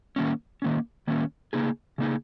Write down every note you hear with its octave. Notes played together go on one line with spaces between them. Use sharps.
D#3 A#3 C#4
D#3 A#3 C#4
D#3 A#3 C#4
C#3 A#3 D#4 G#4
C#3 A#3 D#4 G#4